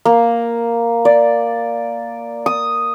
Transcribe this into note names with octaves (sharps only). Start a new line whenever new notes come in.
A#3
D5
D#6